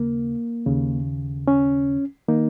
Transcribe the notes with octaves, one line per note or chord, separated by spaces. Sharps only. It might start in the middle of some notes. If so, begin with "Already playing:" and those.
Already playing: D#2 C#3 A#3
D#2 C#3
C#4
D#3 A#3 D#4